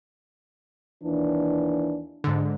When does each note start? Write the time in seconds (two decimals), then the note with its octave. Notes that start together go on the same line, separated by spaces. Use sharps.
1.04 D#2 E3 D4
2.24 G#2 D3